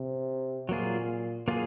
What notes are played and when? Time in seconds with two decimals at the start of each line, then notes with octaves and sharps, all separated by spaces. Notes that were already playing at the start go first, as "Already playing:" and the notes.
Already playing: C3
0.69 A#2 F#3 A#3 F4 G#4
1.48 F#3 A#3 F4 G#4